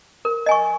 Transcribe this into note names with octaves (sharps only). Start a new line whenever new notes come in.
A#4
D#5 G#5 C#6